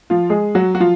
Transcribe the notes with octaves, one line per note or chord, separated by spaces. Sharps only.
F3 F4
G#3 G#4
F#3 F#4
F#4
F3 F4